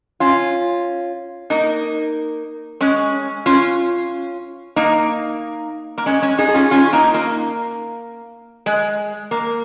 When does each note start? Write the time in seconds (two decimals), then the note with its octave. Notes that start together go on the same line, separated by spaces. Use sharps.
0.20 C#4 F4
1.50 A#3 D#4
2.81 G#3 C#4
3.46 C#4 F4
4.76 A#3 D#4
5.98 A#3
6.06 G#3 C#4
6.22 G#3 C#4
6.38 D#4 G#4
6.48 G#4
6.54 C#4 F4
6.71 C#4 F4
6.93 A#3 D#4
7.14 A#3
8.66 G#3
9.31 A#3